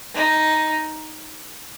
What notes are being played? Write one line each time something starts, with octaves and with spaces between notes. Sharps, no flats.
D#4